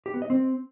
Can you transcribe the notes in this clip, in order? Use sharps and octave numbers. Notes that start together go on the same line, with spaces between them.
G4
B3
D#5
C4